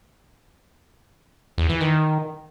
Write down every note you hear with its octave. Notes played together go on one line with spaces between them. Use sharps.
E2
E3
D#3